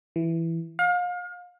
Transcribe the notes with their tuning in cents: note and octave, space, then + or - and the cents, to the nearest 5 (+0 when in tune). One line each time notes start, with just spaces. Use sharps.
E3 +5
F5 +35